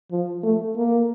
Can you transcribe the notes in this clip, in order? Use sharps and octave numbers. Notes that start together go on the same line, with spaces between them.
F3
A3
A#3